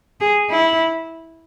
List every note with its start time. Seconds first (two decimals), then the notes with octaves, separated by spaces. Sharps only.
0.20 G#4
0.50 E4